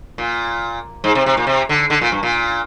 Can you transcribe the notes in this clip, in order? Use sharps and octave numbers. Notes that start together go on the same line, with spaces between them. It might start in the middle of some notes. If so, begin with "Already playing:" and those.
A#2
G#2
C3
C3
A#2
C3
D3
D3
A#2
G2
A#2